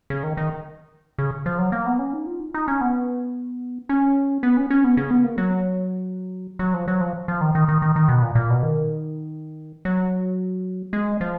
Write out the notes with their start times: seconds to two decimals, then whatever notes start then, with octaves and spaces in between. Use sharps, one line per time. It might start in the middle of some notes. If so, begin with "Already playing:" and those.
0.10 C#3
0.23 D#3
0.37 D#3
1.18 C#3
1.46 F3
1.58 F#3
1.72 A#3
1.86 B3
1.99 C#4
2.13 D#4
2.26 F4
2.40 D#4
2.54 D#4
2.68 C#4
2.81 B3
3.89 C#4
4.43 B3
4.57 C#4
4.70 C#4
4.84 B3
4.97 C#3
5.11 B3
5.24 A#3
5.38 F#3
6.59 F#3
6.74 F3
6.88 F#3
7.01 F3
7.28 F3
7.41 D#3
7.55 D#3
7.68 D#3
7.82 D#3
7.96 D#3
8.08 B2
8.22 A#2
8.35 A#2
8.50 B2
8.63 D#3
9.85 F#3
10.93 G#3
11.21 F3